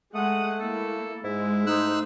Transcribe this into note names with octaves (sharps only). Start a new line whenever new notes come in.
G#3 A3 F#5 D#6
A#3 E4 A4
G#2 G#3 E4
A3 D#4 C5 E6 F#6